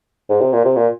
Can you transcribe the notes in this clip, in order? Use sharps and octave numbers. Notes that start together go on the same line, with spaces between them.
G#2
C3
A#2
C3
A#2